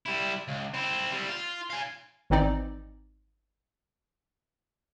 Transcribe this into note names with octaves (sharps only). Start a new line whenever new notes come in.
G3 E4
C#2
C4 E4
G3 E4
F4
F5 G#5
G#1 E3 C4 D#4 D5